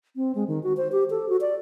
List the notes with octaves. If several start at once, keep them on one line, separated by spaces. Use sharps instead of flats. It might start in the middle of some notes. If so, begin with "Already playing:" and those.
C4
G#3
D#3
F#4
C5
G4
A4
F#4
D5